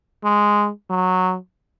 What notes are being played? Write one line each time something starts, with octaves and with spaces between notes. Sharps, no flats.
G#3
F#3